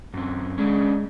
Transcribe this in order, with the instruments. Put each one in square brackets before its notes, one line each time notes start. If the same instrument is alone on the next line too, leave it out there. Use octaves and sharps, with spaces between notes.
[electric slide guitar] F#2 C4
[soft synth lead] G#3 [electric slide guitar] C#4 D4 G#4